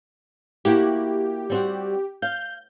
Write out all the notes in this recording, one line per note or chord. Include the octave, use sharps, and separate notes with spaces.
A#3 E4 F#4 G4
G3 C4 F#4
F5 G6